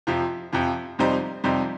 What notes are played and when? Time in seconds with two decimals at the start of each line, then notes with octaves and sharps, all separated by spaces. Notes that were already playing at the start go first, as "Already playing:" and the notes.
0.07 F2 C3 F3
0.53 F2 C3 F3
0.99 F2 C3 G3 D#4 C5
1.44 F2 C3 G3 D#4 C5